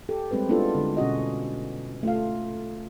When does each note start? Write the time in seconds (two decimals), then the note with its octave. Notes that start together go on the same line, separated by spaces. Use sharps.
0.09 G4 A4
0.31 G3 G#3 C4 G4 B4
0.49 G#3 B3 D4 E4 F4 A4
0.75 D3 G#3
0.97 B2 C#4 F#4 D#5
2.03 A3 F4 F5